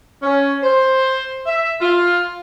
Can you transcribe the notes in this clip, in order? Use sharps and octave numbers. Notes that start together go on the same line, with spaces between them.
C#4
C5
E5
F4